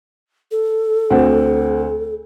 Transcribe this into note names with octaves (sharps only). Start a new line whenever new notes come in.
A4
D2 C4 F#5